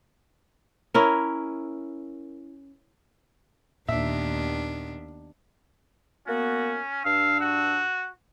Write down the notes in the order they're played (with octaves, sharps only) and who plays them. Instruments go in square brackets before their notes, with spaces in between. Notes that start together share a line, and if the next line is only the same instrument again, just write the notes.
[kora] C#4 E4 A#4
[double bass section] D#2 [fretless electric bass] A#2 [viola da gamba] D#3 B3 D4 [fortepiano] E5
[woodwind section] A#3 B3 F#4 [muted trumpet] C#4
[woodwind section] G2 D4 E6 [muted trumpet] F5
[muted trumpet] F#4